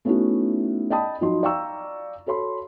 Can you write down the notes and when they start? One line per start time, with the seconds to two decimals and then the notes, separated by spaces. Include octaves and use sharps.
0.05 A3 B3 C#4 D#4 E4 F#4
0.90 D5 D#5 G5 A5 B5 D#6
1.21 F3 F#3 D#4 F#4 D#5 C6
1.43 D5 F5 G5 A#5 C#6 E6
2.26 F#4 A4 C#5 B5 C6